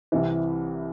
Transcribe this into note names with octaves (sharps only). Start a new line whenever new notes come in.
C2 C3 E3